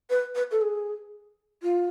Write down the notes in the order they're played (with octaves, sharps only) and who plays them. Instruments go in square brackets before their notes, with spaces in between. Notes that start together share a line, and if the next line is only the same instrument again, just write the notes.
[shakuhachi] B4
B4
A4
G#4
F4